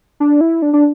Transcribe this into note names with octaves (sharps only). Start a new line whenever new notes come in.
D4
E4
D4
D4